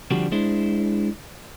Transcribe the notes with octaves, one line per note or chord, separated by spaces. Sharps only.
D3 F3 G3 C4 D4 F#4
G#3 D4 E4 C5